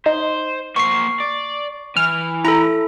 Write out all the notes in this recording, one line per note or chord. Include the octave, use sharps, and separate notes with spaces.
D#4 C5
A#3 C5 C#6 C7
D5
E3 F6
E4 A4 A#5